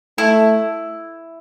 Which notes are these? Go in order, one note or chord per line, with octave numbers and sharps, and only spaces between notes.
A3 E4